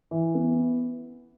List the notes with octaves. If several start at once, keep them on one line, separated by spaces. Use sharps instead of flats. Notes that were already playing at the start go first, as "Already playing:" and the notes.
E3
B3